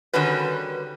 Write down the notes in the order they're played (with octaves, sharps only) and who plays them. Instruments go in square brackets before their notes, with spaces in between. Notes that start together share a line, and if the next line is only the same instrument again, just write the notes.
[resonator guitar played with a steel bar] D3 D#3 G3 C#4 F#4 B4